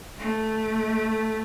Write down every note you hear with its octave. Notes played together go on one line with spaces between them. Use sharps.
A3